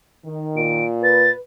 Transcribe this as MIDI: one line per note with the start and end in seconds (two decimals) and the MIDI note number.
0.25 0.83 51
0.56 1.31 46
0.56 0.84 98
1.03 1.37 71
1.03 1.30 93